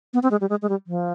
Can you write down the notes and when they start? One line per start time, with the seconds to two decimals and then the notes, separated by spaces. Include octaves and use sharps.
0.14 B3
0.23 C4
0.31 G#3
0.41 G3
0.50 G#3
0.62 G#3
0.69 G3
0.87 F3